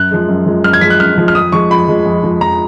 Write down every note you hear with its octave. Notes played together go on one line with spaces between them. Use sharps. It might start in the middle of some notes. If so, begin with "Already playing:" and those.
Already playing: F#2 F#6
F3 G#3
F#2
F3 G#3
F#2 F6
G#6
F3 G#3 B6
F#6
F#2 F6
F3 G#3
F6
F2 D#6
F3 G#3 C#6
F2 B5
F3 G#3
F2
F3 G#3
F2 A#5